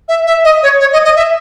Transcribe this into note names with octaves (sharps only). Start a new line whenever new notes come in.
E5
E5
D#5
C#5
C#5
D#5
D#5
E5